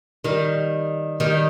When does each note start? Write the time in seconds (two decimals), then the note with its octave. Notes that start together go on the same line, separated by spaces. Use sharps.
0.24 D#3 G3
1.20 D#3 G3